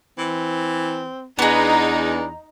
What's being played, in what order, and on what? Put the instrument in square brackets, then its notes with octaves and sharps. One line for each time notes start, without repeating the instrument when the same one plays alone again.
[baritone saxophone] E3 [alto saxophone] C4
[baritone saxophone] E2 [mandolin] B3 G#4 [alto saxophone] D4 [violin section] D#4 A#5